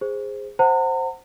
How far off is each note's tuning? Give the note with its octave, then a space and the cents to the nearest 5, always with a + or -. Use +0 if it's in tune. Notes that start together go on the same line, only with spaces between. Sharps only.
G#4 -15 C5 +0
C5 +0 F#5 +0 A#5 -45